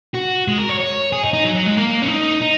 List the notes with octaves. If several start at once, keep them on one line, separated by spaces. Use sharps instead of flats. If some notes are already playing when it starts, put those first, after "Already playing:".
F#4
G#3
A#4
C#5
C#5
G#4
D#4
D#4
F#3
F#3
G#3
A#3
C#4
D#4
D#4